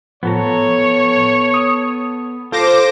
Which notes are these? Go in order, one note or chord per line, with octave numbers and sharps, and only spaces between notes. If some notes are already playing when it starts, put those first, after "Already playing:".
A2 F3 B3 A4 C#5 A#5
D#6
F4 A4 C5 D6 A#6